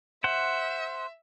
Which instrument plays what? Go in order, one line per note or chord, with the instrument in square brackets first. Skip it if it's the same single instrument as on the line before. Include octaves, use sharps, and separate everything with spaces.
[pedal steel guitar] C5 F#5 [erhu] E5